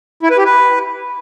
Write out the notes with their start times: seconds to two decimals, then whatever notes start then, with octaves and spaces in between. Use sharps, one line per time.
0.23 E4
0.30 B4
0.38 G4
0.45 B4